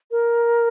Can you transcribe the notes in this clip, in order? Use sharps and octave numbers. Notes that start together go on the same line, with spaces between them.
A#4